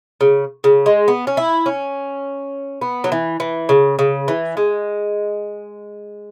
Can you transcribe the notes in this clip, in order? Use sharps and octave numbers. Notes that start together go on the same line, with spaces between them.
C#3
C#3
G#3
B3
C#4
E4
C#4
B3
F#3
E3
E3
C#3
C#3
E3
G#3